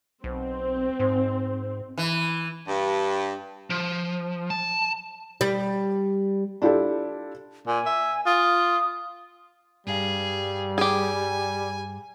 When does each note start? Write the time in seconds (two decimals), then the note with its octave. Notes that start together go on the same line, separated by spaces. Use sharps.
0.24 B1 C4
1.00 G#2
1.98 E3
2.67 G2
3.70 F3
4.50 A5
5.41 G3
6.62 D4 E4 F4 G4 A4
7.67 A#2 G#5
7.86 E5
8.26 F4 D#6
9.87 G2 G3 G#4 F5
10.78 G4 G#4 G#5